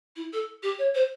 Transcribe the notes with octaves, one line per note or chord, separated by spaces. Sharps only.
E4
A4
G4
C#5
C5